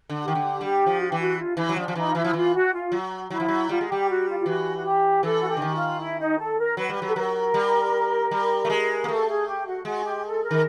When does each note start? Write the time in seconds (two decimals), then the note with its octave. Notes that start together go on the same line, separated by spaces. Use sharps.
0.09 D3
0.22 G4
0.28 D#3
0.35 D3
0.61 G3 G4
0.86 F3
0.99 F#4
1.08 E3 G4
1.18 F#4
1.38 F4
1.56 E3 E4
1.69 F#3
1.76 F3 D4
1.88 F3
1.96 E3 D#4
2.07 F4
2.14 E3 E4
2.24 F3
2.33 E3 F4
2.53 F#4
2.73 F4
2.92 F#3
3.30 F#3 E4
3.40 F3
3.48 F#3
3.69 G3 F4
3.81 G#3
3.88 G3 G4
4.08 F#4
4.27 F4
4.38 F4
4.46 E3 F#4
4.75 F#4
4.85 G4
5.23 E3 A4
5.38 F#4
5.49 G4
5.57 D3
5.62 D#3
5.75 F4
6.00 E4
6.19 D#4
6.38 A4
6.57 A#4
6.77 F#3 B4
6.89 G3
7.02 F#3
7.07 A4
7.15 F#3 A#4
7.54 G3
8.31 G3
8.65 A3
8.70 G#3
9.04 A#3
9.08 A3 A4
9.28 G#4
9.47 G4
9.66 F#4
9.85 G#3 F#4
10.04 G4
10.24 A4
10.43 A#4
10.51 D#3